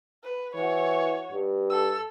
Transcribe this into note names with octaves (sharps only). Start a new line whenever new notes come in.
B4
E3 F#4 C#5
G2
A4 E6